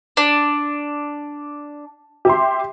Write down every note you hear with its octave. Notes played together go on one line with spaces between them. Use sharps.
D4
G4 E5 C6